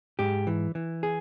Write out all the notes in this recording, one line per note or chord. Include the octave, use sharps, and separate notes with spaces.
G#2 G4
E3
E3
G#4